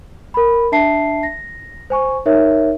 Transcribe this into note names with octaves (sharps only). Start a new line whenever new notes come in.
A#4 B5
D4 E5 A5 C7
A#6
C5 G#5 C#6
D#4 A#4 C#5 E5